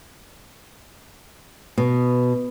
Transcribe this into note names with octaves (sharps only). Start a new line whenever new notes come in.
B2